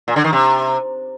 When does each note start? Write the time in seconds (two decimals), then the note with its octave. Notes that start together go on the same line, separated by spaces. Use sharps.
0.08 A#2
0.16 D3
0.24 D#3
0.33 C3